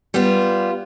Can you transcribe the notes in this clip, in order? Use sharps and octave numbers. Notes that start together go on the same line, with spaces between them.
G3 B3 F4